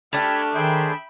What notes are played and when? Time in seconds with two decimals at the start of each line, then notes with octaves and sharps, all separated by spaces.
0.13 A3 D4 G4 A5 B5 F6 G#6
0.55 D#3 G#4 C5 E5 G5 B5